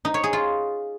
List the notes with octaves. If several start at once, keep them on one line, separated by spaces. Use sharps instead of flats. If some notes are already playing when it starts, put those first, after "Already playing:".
D#4
C#5
G#4
F4